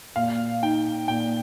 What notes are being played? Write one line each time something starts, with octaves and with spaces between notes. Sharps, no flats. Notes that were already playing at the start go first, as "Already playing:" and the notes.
A#2 F5
D#4 G5
A#2 G5